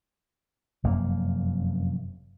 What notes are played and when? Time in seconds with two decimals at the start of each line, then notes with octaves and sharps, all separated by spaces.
0.84 F1 F#2 A#3